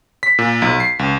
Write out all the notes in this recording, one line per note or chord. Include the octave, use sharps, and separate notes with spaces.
B6
A#2
B1
C7
C#2